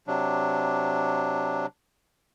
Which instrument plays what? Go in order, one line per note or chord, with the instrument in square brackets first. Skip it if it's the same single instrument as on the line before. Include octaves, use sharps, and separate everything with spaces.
[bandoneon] C3 F#3 D4